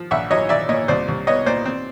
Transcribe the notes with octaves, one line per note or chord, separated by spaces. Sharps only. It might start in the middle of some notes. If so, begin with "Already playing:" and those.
Already playing: F3
A#1 E5 F#5
F#3 C#5 D#5
A#1 D5 E5
A#2 C#5 D#5
C2 C5 D5
C2
B3 C#5 D#5
A#2 C5 D5
C4